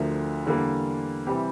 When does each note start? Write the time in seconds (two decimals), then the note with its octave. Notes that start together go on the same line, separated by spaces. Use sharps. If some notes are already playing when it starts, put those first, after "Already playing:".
Already playing: D2 D3 F3 A3 A#4
0.46 E2 D3 G3 A#3
1.27 C3 E3 G3 C4 G4